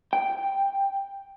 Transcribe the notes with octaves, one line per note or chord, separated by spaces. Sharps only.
G5